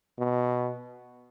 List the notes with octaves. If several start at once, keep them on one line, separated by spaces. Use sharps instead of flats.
B2